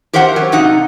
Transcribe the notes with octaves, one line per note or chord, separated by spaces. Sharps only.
G4 A#4 C5 E5 F#5
F#3
C3 D#4 F#5